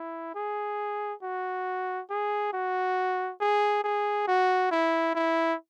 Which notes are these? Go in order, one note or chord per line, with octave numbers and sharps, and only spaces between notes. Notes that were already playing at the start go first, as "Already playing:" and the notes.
Already playing: E4
G#4
F#4
G#4
F#4
G#4
G#4
F#4
E4
E4